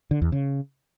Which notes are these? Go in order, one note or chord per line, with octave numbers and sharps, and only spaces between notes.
D3
E2
C#3